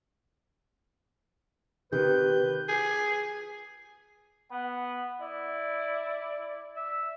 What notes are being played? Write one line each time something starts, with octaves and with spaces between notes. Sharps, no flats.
C3 D#3 G4 B4 G6
G#4
B3 F#5
E4 D5
E5